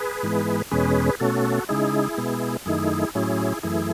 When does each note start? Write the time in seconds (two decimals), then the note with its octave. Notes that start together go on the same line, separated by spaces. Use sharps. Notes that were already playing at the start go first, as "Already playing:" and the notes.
Already playing: G#4 B4
0.23 G#2 E3 G#3 B3
0.71 E2 B2 G#3 C#4 G#4 B4
1.20 B2 A3 C#4 F#4 A4
1.69 C#3 G#3 D#4 E4 G#4
2.18 B2 G#3 B3
2.66 F#2 D#3 A3 D#4 E4 G#4
3.15 A2 F#3 C#4 E4 G#4
3.63 F#2 E3 A3 E4 G#4